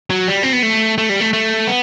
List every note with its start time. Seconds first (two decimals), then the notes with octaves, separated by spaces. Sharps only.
0.10 F#3
0.28 G3
0.43 C4
0.53 B3
0.63 A3
0.98 A3
1.09 G3
1.20 A3
1.33 A3
1.67 B3